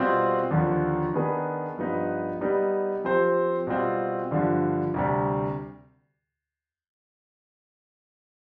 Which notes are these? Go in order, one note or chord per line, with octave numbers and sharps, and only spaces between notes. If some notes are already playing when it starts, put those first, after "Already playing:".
Already playing: B2 G3 C4 F4 C5
D#2 D3 F3
D#3 B3 D4 G#4 B4
G2 F3 B3 D#4 B4
G3 B3 D#4 G4
F3 C4 G4 C5
B2 G3 C4 F4
G2 D3 F3
D2 C3 G3